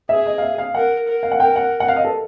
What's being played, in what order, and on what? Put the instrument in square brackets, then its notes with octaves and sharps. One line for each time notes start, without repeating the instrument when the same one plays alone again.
[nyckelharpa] G#4 [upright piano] E5
[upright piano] D#5
F5
E5
F5
[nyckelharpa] A#4 [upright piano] F#5
[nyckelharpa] A#4
[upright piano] F5
F#5
[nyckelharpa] A#4 [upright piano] G5
[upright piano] F#5
F#5
F5
D#5
A4